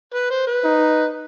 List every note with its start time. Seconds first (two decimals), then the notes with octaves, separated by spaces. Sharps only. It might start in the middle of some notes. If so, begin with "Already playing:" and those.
0.14 B4
0.31 C5
0.47 B4
0.64 D#4